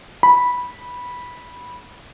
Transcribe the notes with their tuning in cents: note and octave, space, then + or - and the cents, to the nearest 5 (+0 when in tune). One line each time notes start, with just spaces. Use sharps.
B5 -10